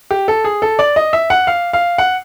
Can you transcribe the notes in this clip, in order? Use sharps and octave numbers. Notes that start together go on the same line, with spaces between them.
G4
A4
G#4
A4
D5
D#5
E5
F#5
F5
F5
F#5